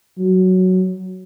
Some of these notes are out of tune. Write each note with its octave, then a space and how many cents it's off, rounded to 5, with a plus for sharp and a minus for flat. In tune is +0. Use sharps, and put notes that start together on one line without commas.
F#3 +5